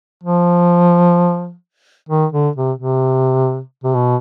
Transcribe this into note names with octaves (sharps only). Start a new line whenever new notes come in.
F3
D#3
D3
C3
C3
C3
B2